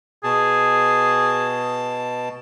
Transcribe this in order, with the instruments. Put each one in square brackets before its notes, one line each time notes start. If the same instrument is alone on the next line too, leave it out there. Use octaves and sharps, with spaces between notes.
[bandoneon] B2 A5 [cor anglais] G#4